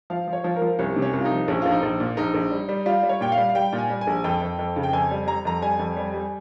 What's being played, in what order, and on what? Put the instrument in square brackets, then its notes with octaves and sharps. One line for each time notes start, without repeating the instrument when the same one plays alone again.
[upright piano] F3 F5
F3
C#5
F3
A#4
F3
C2 C#4
C3
C#4
C2
F4
D#4
F3
A#1 C#4
A#1 F4
D#4
A#1
A#2
A#1 D#4
A#1
G3
G3
G3 F4
G3
C#5
A#2 G5
F5
G3
F5
G3 G5
A#2
G#5
G3
G#5
A#1
F2 G5
F2
F2
C#3
G5
F2 G#5
G3
G3 A#5
F2 A#5
G3 G#5
F2
G3
G3